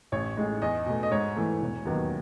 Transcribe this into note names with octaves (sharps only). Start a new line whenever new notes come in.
A1 C#5
A2 G#3 D#4
E2 D#5
B2 A3
D#5
G#2 C#5
E3 A3
E1
D#2 D#3 F#3 B3